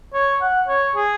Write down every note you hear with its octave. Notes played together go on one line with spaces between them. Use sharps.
C#5
F#5
C#5
G#4